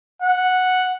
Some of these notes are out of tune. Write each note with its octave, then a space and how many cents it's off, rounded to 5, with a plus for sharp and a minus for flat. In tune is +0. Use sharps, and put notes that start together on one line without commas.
F#5 -5